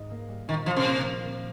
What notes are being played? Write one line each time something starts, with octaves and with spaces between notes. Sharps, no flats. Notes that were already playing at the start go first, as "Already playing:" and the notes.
Already playing: G#2 D#4
A#3
G3
A#2 D#3
F3 A#3
C3
A#3
F3
A#3